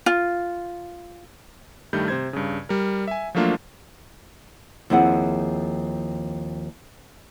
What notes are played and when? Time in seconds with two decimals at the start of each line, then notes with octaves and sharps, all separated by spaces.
0.06 F4
1.93 G2 D#3 G3 A3 G6
2.08 C3 C5 G#6
2.33 G2 C#3
2.69 G3 A#4
3.08 E5 G#5
3.35 F3 F#3 A3 A#3 D4 F4
4.90 D#2 F3 C4 E4 G#4 F#5